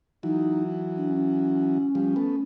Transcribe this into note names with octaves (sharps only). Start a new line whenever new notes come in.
E3 F#3 D#4
D4
C#4
F3 G3
A3 B3